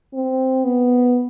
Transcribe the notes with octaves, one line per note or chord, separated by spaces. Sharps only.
C4
B3